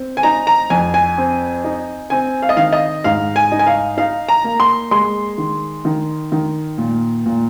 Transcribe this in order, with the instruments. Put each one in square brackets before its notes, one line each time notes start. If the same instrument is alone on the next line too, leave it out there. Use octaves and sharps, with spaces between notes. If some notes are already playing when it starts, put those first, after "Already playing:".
Already playing: [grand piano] C4
G#5
D#4 A#5
A#5
F2 G#5
G#5
C4
D#4
C4 G#5
F5
D#5
D#3 F5
D#5
G#2 F5
G#5
D#4
G#5
F5
D#4 F5
A#5
A#3
C6
G#3 C6
D#3
D#3
D#3
A#2
A#2